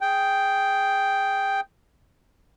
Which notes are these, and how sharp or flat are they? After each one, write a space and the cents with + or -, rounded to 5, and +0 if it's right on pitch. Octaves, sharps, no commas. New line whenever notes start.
G#4 +0 G5 +0